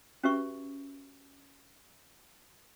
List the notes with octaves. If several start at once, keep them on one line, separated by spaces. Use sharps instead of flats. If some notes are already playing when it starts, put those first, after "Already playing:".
C#4 F#4 G4 B4 E5 C#6